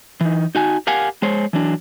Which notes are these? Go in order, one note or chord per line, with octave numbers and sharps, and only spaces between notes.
E3 D#4
D#4 F#4 G#5
G4 A#4 F5 F#5 G#5
G#3 C5 C#5
E3 F#3 D4